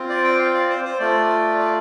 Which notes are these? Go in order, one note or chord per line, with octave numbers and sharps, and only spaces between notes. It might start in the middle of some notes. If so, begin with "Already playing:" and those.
Already playing: C4 F4
D5
G5
F5
D5
C5
C5
A3 F4 D5
D5